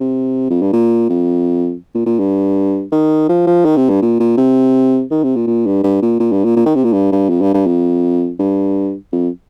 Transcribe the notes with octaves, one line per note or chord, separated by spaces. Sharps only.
C3
F2
G2
A#2
F2
A#2
A#2
G2
D#3
F3
F3
D#3
C3
G2
A#2
A#2
C3
D#3
C3
A#2
A#2
G2
G2
A#2
A#2
G2
A#2
A#2
D#3
C3
A#2
G2
G2
F2
G2
G2
F2
G2
F2